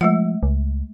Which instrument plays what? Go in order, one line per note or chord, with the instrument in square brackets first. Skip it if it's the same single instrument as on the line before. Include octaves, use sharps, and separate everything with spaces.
[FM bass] F3 [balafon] G#3 A3 F#5
[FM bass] C#2